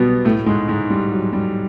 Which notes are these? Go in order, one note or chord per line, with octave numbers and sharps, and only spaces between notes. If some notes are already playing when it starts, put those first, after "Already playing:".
Already playing: B2 F#3 G3 B3
A2 A3
G#2 G#3
G#2 G#3
G3
F#3
G3